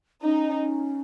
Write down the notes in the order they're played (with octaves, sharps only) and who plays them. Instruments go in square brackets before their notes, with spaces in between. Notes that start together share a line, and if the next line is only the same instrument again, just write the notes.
[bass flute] C#4 [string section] D#4